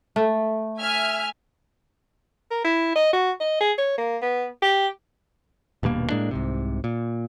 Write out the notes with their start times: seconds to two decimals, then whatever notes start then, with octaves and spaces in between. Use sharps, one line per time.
0.16 A3
0.80 E5 G#5 F6
2.51 A#4
2.65 E4
2.96 D#5
3.13 F#4
3.41 D#5
3.61 G#4
3.78 C#5
3.98 A#3
4.22 B3
4.62 G4
5.83 D#1 G2 B2 A#3
6.10 A2 G#3 A#3 D4
6.31 C2 G#2 C3
6.84 A#2